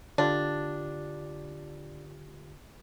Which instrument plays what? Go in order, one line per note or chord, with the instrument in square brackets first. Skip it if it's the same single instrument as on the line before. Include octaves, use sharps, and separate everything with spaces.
[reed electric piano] D3 F4 G4 [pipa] D4